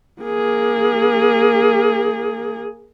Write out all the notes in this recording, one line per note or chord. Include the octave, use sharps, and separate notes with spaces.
A#3 G#4